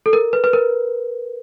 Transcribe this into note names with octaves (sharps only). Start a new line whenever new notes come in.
A4
A#4
B4
B4
A#4